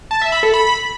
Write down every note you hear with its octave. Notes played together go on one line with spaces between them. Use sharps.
A5
E5
B5
A4
B5